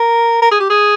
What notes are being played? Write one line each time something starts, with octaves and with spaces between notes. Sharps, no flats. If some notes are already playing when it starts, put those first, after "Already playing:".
Already playing: A#4
A#4
G#4
G4
G#4